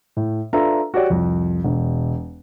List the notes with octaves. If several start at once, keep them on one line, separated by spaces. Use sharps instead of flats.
A2
D4 F4 A4 B4 E5 A#5
F#4 G4 C#5 D5
C2 F2
E1